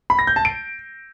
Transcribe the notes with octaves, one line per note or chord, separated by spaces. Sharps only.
B5
A#6
G6
A5
D7